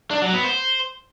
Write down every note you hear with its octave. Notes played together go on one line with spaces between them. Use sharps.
D4
F#3
B3
C5